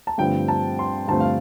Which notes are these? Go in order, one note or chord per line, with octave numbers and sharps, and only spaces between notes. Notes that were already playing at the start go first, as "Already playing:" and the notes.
A5
G2 D3 F3 A3 C4 G5
A5
C6
G2 D3 F3 A3 C4 A5
F5